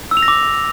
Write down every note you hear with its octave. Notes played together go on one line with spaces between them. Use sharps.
E6
F7
A#6
D6